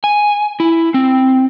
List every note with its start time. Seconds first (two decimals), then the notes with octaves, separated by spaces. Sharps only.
0.04 G#5
0.60 E4
0.94 C4